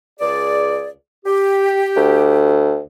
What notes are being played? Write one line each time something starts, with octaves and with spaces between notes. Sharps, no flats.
C#2 G#4 D5
G4
D2